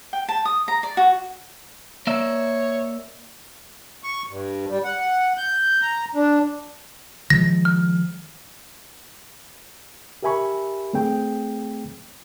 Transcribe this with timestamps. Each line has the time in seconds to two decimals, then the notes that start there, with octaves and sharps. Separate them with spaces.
0.13 G5
0.29 A5
0.45 D#6
0.68 A#5
0.83 D5
0.97 F#4
2.07 A#3 C#5 D5 E5
4.04 C#6
4.29 G2
4.70 G3
4.84 F#5
5.38 G6
5.82 A#5
6.15 D4
7.30 D#3 F3 G#3 A#6
7.65 F6
10.23 G4 A#4 E5 G#5 B5 C#6
10.93 A3 C4 G#4 G5